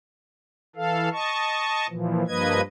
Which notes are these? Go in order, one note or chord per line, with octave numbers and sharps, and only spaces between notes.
E3 A4 F5
D#5 A5 C#6
A#2 E3 F3
G2 F3 A#3 B4 D#5 G#6